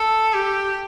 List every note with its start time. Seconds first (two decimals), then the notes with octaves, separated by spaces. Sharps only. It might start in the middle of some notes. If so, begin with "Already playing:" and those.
Already playing: A4
0.34 G4